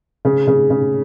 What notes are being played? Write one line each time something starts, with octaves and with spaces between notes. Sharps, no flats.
C#3
C#3
C#3